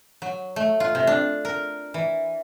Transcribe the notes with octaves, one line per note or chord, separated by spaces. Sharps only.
F#3
A3
F4
C3
D4
A#4
E3